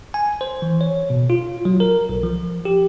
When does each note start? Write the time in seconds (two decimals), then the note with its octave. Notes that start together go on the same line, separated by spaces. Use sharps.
0.14 G#5
0.41 C5
0.62 E3
0.81 C#5
1.10 B2
1.30 F4
1.65 F#3
1.80 A#4
2.09 B1
2.23 F3
2.65 G4